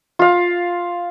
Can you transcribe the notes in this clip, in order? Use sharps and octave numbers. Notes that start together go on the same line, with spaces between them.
F4 F5